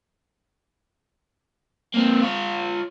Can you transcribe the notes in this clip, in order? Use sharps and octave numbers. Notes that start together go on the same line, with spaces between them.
A#3 C4
F4 C#5